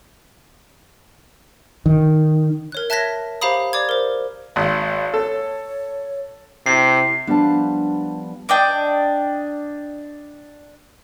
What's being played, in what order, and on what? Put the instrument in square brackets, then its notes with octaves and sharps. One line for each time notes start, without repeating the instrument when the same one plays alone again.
[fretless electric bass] D#3
[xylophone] A#4 C#5 F#6
E5 A5 F#6 G#6 A#6 B6
G4 C5 F5 A#5 B5 D#6
D5 D6 G#6
A#4 C5
[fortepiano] G#1 [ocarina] F5
[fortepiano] A4 [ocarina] C#5
[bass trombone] C3 [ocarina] E4 [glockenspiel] C7
[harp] F3 G3 B3 [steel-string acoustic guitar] D4 A5
[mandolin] D4 D5 D#5 G5